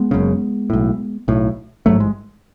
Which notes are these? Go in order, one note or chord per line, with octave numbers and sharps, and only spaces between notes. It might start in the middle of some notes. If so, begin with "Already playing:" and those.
Already playing: G#3 B3
F#1 F#2 C#3
B1 A2
B1 A2
A1 G#2 F#3 A3
G#3